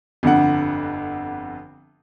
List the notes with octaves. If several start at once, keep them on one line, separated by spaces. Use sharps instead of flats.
G1 F2 D3 F#5